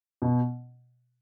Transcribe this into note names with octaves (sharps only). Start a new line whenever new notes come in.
B2